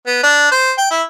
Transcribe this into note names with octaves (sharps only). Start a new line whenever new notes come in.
B3
D4
C5
G5
E4